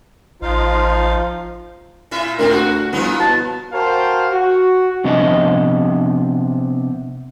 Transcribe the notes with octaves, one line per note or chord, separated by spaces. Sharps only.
A1 F3 D#4 F4 F5
A#2 E4 E5
D2 A2 C4 D4 A#4
F#4 F#5
G1 F3 A#3 B3 E4
B2 A5
F#4 A#4 C5 F5 G5 A5
F#4
C3 F3 B3 D4 D#5